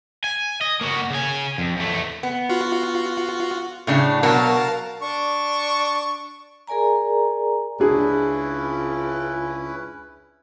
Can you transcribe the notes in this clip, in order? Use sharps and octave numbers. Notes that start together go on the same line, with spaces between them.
G#5
D#5
A#3 F#4
C#3 G#5
F2
E2 A3
B3
F4 F#4
A2 C#3 D4
B2 F#3 A#4 F5 A5
D4 C#6
G#4 A#4 D5 G#5 A#5
C#2 C#4 D4 E4 G#4 B4